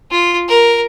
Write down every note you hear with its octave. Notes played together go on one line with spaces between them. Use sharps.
F4
A#4